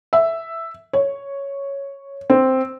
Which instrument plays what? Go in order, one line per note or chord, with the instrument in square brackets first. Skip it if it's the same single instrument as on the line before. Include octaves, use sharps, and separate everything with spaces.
[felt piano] E5
C#5
C4